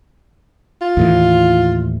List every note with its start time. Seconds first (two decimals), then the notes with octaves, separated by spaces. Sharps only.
0.81 F4
0.97 D#2 A2 E3